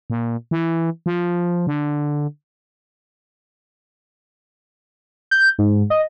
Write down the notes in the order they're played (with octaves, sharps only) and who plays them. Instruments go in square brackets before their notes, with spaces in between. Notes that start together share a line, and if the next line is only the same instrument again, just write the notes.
[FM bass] A#2
E3
F3
D3
[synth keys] G6
G#2
D#5